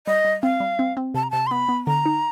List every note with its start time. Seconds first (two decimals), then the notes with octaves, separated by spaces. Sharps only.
0.07 G3 D#5
0.25 G3
0.43 C4 F5
0.60 G3
0.79 C4
0.97 C4
1.14 C3 A5
1.23 A#5
1.31 C3 A5
1.47 C6
1.51 B3 B5
1.69 B3
1.87 D3 A#5
2.06 D#4